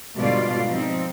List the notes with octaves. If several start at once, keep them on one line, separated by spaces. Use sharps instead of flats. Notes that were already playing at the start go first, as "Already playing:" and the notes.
G#2 B2 D3 G3 F4 D5
F3 C4 D#4